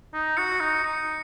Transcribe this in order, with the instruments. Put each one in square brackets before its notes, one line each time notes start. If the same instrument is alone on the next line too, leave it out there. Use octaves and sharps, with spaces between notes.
[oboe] D#4
[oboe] F#4 [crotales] C#7
[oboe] D#4
[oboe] D#4 [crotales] C#7